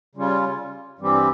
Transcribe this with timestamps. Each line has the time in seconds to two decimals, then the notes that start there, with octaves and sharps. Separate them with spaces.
0.15 C#3 G3 C#4 F4
0.99 G2 E3 G3 C4 G4